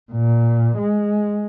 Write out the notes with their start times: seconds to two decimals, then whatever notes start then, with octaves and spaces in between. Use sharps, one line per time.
0.12 A#2
0.77 G#3